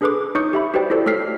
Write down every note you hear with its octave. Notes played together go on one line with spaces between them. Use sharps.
D4 G#4 A4 B4 C6 D6
D#4 C#5 C#6 D#6 G6 C#7
G4 E5 B5
F#4 G4 B4 C5 D5 G5
E4 F#4 G4 A4 C5 D5
A3 A4 C#5 F6 B6 C7